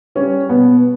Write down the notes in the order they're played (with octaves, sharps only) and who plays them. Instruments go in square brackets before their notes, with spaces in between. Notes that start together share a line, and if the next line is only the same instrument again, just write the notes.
[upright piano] G3 C#4
B2 B3